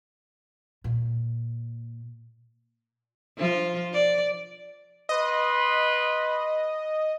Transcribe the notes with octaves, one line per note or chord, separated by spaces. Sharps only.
A#2
F3 F4
D5
B4 D#5 C6